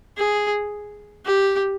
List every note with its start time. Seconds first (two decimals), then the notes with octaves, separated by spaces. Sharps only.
0.17 G#4
1.25 G4